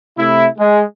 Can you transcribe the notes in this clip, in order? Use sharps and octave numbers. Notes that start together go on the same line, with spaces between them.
C3 A3 E4
G#3